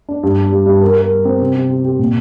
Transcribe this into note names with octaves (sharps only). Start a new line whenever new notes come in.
D4
G2
G3
G3
G2
A#4
A#4
G3
C4
C3
C3
G4
G4
A#2